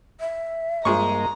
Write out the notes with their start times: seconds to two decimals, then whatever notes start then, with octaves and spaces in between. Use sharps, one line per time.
0.20 E5
0.85 G2 F3 G#3 A#3 D#5 A#5 C#6